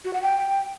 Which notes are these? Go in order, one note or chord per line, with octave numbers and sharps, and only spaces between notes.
F#4
F#5
G5